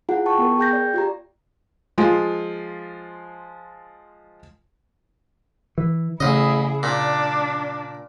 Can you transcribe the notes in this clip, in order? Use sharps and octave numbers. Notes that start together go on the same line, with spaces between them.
E4 F4 G#4 F#5
G5 A5 C#6
B3 A#4
G#4 G5 G6 A#6
D5
F4 G4 A#5
F3 G#3 F4
E3
A1 C#3 E4 G#4 D#5
A#2 D4